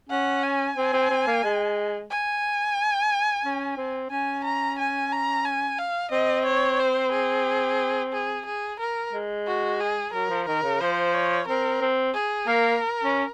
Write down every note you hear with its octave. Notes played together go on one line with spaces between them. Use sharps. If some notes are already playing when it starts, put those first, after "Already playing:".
C#4 F#5
G#5
C4
C4
C4
A#3
G#3
G#5
C#4
C4
C#4 G#5
A#5
G#5
A#5
G#5
F5
C4 D#5
C#5
C5
G#4
G#4
G#4
A#4
G#3
F#4
G#4
F#3 A#4
F3
D#3 A#4
C#3
F3 C5
C#5
C4 A#4
C4
G#4
A#3 A#4
C#4